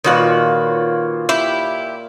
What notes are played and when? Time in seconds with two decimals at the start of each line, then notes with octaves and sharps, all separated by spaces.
0.04 A#2 D#3 F4 F#4 B4 C#5
1.29 E4 G4